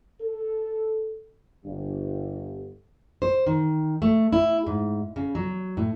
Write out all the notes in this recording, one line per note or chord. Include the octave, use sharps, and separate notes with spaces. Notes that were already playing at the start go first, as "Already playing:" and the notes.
A4
G1
C5
D#3
A3
E4
G#2
C#3
F#3
A2